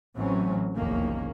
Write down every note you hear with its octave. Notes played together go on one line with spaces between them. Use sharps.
A1 E3 F#3 A3 C4 C#4
F1 B1 E2 D#3 A#3 C#4